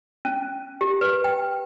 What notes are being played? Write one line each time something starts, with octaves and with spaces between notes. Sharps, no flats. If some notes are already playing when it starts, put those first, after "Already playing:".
C#4
G4
B4
G5